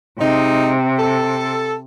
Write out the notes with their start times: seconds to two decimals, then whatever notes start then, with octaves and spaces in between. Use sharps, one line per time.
0.19 C3 G#3 D#4
0.97 A4